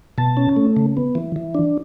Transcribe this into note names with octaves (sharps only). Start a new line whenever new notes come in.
B2 A5
C#4
A3
C#3
B3
E3
E3
D4